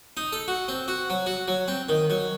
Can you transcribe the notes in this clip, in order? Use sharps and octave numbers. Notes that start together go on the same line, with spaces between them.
D#4
A4
F#4
C4
F#4
F#3
F#4
F#3
C4
D#3
F#3